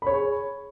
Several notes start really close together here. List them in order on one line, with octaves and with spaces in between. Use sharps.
B5 C#5 G#4